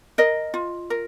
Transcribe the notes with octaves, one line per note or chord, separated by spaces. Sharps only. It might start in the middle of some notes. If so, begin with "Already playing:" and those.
A#4 D#5
F4
A#4